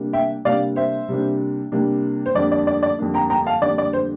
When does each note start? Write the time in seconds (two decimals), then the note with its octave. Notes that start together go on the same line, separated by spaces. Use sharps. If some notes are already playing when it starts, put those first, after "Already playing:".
Already playing: C3 G3 A#3 D4
0.13 E5 G5
0.45 C3 G3 A#3 D4 D5 F5
0.76 C5 E5
1.08 C3 G3 A#3 D4
1.72 C3 G3 A#3 D4
2.26 C5
2.35 F2 D3 G3 A#3 D4 D5
2.52 D5
2.67 D5
2.83 D5
2.99 F2 D3 G3 A#3 D4
3.14 G5 A#5
3.30 G5 A#5
3.46 F5 A5
3.61 F2 D3 G3 A#3 D4 D5
3.78 D5
3.93 C5